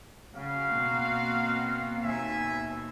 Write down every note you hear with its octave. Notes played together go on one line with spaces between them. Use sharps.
C#3 F#4 F5
B2 A#3 C4
D#2 B2 E5 G#5